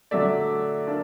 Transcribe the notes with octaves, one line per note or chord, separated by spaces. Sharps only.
D3 F#3 A3 D5 E5
A#3 D4